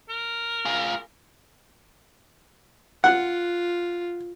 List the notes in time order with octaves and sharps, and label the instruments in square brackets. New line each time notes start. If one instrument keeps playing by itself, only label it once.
[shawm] A#4
[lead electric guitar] F4 G#4
[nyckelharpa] F4 [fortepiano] F#5